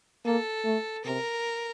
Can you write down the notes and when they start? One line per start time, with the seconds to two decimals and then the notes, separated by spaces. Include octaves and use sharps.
0.25 A#3 A4
0.64 A3
1.04 C3 A#4